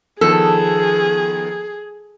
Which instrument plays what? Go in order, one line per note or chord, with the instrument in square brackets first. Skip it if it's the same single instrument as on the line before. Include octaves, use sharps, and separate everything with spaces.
[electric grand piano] D#3 F3 B3 [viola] G#4 [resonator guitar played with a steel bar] A4